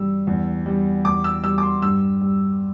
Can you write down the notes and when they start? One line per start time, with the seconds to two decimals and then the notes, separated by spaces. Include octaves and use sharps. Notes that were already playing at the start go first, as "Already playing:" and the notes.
Already playing: G2 E3 G3 E6
0.27 E2
0.66 G3
1.05 E2 D6
1.24 E6
1.44 G3 E6
1.58 D6
1.63 C6
1.82 G2 E6
2.21 G3